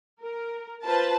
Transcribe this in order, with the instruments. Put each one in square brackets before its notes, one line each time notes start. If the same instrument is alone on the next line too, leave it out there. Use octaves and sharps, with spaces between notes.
[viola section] A#4
[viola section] F4 C5 [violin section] B4 A5